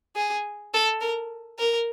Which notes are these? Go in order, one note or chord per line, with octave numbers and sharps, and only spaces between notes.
G#4
A4
A#4
A#4